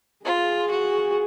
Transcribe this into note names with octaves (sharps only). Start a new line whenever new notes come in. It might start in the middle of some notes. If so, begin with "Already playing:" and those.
F4 G#4
F#4